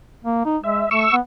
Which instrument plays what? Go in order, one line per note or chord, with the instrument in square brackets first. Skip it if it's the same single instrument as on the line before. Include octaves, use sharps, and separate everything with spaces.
[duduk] A#3
D#4
[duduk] G#3 [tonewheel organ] E5
[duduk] A3 [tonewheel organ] C#6 E6
[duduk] B3